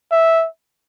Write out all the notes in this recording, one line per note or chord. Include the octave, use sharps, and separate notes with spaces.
E5